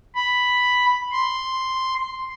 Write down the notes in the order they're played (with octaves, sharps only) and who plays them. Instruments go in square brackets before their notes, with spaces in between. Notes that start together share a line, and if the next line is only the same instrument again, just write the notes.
[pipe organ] B5
C6